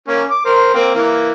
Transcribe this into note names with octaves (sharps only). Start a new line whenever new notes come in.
A#3 C#4
D6
A#4 C5
A#3 C4
E3 A#3